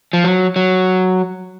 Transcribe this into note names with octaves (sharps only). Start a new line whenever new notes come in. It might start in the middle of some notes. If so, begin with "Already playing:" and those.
F3
F#3
F#3